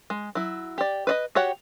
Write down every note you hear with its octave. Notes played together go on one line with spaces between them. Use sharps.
G#3
F#3 E4
G4 D5
B4 D5 D#5
F#4 G4 C#5 F#5 G5